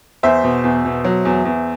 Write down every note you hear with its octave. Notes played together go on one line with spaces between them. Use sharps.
E2 C5 E5
B2
E2
B2
F#3
E2
E2